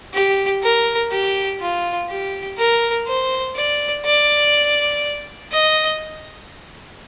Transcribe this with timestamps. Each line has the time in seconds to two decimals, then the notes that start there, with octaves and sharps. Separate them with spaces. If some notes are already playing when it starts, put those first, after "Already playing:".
0.14 G4
0.63 A#4
1.11 G4
1.60 F4
2.10 G4
2.59 A#4
3.07 C5
3.56 D5
4.05 D5
5.52 D#5